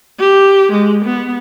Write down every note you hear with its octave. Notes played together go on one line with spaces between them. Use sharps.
G4
G#3
B3